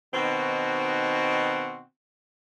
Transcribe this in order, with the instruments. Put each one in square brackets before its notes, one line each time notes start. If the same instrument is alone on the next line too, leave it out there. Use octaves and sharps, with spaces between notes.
[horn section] B2 D#3 C4 D#4 F#4